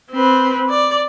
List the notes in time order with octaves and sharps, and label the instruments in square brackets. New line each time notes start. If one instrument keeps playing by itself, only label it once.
[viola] C4 B4
D5